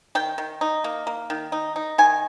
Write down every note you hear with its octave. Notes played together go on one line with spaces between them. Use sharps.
D#3 G5
D#3
D#4
A#3
A#3
D#3
D#4
D#4
D#3 G#5